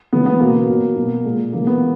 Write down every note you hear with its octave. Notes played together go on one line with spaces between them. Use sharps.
C#3 E3 G#3 B3
B3
B2 F#3 A#3
B2 F#3
B2 F#3
A#2 G#3
C#3 E3 G#3 A#3
B3